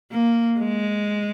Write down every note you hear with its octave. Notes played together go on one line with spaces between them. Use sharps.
A#3
G#3